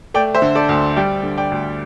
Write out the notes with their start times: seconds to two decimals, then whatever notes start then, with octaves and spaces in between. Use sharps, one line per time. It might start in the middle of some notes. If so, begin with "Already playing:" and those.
0.14 A3 D5 G5
0.35 C5 E5
0.42 D3
0.55 A4 D5
0.69 D2
0.96 G3 D5 G5
1.23 D3
1.38 D5 G5
1.51 D2